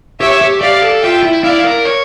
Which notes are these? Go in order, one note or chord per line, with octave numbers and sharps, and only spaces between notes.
G4 C#5 E5
G4
G4 D5 F5
A4
F4 E5 G5
E4
E4 D5 F5
A#4
C#5